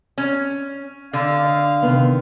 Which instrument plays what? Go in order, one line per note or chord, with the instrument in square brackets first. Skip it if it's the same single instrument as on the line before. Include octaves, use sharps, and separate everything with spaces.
[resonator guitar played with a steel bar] C#4
[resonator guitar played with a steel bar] D3 [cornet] F5
[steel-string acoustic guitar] D#5
C3 D#3 B3